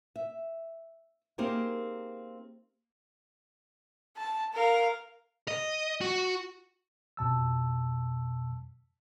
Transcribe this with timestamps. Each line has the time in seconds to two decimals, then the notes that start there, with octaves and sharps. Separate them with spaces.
0.16 E5
1.38 A#3 C4 D#4 G4 G#4 A#4
4.17 A5
4.53 A#4 F5
5.48 D#5
6.01 F#4
7.17 F2 B2 A5 E6